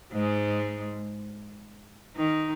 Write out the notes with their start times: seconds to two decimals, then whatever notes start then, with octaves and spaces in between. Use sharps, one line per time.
0.12 G#2 G#3
2.16 D#3 D#4